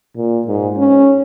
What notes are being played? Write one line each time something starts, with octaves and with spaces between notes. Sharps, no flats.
A#2
G#2
C#4